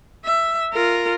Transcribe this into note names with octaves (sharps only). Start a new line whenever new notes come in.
E5
F4 A#4